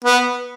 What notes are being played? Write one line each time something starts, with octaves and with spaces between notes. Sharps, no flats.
B3